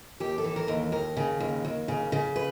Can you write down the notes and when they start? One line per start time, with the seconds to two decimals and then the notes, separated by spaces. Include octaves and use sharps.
0.20 D#2 G4
0.38 A4
0.44 E3
0.56 A#4
0.68 D#2
0.92 D#2 A#4
1.17 C#3
1.40 D#2
1.65 D#2
1.88 C#3
2.12 C#3
2.36 B4